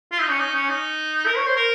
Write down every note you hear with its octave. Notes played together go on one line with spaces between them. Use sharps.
F4
D#4
C#4
D#4
C#4
D#4
A#4
C#5
C5
A#4